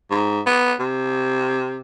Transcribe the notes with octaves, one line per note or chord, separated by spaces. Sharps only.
G#2
B3
C3